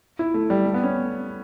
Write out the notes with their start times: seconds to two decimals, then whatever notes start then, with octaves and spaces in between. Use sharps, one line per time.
0.19 E4
0.34 A3
0.50 G3
0.65 A3
0.74 B3
0.84 C#4